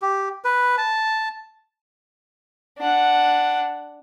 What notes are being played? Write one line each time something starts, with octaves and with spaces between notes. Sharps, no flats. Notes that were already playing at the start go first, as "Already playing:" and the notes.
G4
B4
A5
D4 F#5